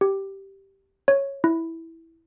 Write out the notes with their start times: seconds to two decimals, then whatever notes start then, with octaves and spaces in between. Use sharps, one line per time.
0.01 G4
1.08 C#5
1.44 E4